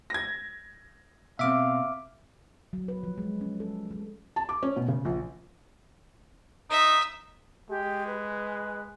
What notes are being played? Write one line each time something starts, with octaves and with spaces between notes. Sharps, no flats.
G#6 A#6
B2 C4 E5 F5 D6
F#3
B4
F3
G#3
C#4
A4
G#3
A5
D6
C#4
B2
C#3
A#1
D#4 E5
G#3 G4
B4